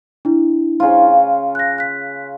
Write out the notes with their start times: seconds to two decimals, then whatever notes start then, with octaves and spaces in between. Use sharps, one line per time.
0.25 D4 E4
0.80 C#3 F4
1.55 F#6 A#6
1.78 F#6 B6